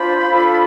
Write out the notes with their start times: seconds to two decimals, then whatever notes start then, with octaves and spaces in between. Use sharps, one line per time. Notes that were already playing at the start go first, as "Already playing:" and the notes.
Already playing: D4 F4 C5 B5
0.30 D4 F4 A4